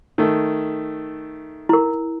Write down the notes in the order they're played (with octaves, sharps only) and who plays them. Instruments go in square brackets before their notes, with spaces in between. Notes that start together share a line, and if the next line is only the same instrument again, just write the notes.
[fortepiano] D#3 A3
[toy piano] E4 A#4